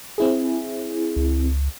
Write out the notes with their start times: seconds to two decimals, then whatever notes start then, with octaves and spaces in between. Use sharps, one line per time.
0.18 C4 E4 G#4
1.16 C#2